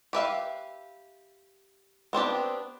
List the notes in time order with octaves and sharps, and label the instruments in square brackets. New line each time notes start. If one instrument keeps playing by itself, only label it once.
[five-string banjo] G4 B4 E5 F5
B3 C4 D4 G4